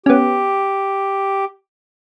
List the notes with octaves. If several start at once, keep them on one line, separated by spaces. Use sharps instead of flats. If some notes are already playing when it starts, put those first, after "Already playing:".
B3 C#4 G4